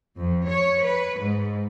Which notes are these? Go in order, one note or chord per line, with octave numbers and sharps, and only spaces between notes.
F2
C#5
B4
G#2